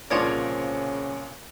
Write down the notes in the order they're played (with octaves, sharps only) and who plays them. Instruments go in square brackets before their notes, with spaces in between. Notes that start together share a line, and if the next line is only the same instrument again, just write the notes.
[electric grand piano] C2 A#2 A#4 [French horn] C#3 [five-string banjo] F3 C#5 D5